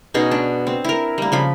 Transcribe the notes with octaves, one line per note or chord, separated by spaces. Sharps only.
B2 C#4 D#4 G#4
D4
C4
E4 A#4
G3 A#3
C#3 F3 B5